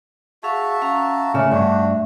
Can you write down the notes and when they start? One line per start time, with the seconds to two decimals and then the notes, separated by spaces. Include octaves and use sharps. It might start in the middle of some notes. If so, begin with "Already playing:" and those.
0.43 F#4 G#4 E5 F5 A5
0.82 C#4 F5 A#5
1.34 C#3 A3 A#4 D5 E5
1.51 G2 D4 F#4